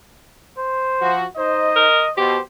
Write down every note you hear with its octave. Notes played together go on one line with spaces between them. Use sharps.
C5
F3 F#4
D#4 C5 D#5
A#4
B2 G4 C5